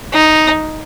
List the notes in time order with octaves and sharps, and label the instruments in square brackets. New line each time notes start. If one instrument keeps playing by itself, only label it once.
[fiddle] D#4